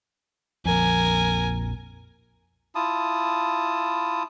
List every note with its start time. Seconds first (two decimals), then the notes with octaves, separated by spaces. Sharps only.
0.66 A#1 F2 A#4 G#5
2.75 E4 F4 A5 D#6